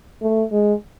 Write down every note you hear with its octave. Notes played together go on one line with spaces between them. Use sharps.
A3
G#3